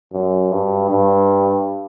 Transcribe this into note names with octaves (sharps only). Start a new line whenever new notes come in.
F#2
G2
G2